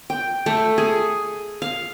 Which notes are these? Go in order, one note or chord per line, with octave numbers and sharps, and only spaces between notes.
G5
A3
G#4
F5